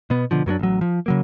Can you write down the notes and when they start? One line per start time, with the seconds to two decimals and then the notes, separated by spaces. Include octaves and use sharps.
0.10 B2 B3
0.31 B2 D3 F3
0.46 F#2 F#3 A#3 D4
0.59 A1 F#3
0.81 F3
1.06 C#3 F#3 A#3